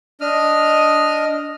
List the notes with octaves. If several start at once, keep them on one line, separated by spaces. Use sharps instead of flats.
D4 D#5 D#6 F6